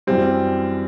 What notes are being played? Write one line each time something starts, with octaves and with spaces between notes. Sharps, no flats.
F#2 E3 G3 C4